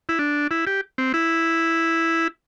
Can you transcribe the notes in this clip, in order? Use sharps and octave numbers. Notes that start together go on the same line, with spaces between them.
E4
D4
E4
G4
C4
E4